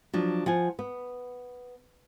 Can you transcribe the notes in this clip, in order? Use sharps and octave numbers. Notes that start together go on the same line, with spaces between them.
F3 F#3 D4
F3 F#5 G#5
B3